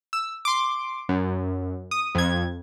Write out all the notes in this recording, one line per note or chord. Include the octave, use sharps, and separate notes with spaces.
E6
C6 D6
F#2
D#6
F2 G#6